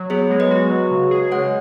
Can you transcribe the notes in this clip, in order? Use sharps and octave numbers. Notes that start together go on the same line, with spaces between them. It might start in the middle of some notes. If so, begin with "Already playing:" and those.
Already playing: F#3
B3 G#4 C#5
G#3
B4 D#5
F#4
F#3
C#3
G#4
G#3 C#5 F#5